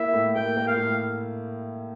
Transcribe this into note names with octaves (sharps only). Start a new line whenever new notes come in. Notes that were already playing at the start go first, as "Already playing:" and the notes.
Already playing: A#3 E4 E5
A2
A#3 G5
A#3
F5
A2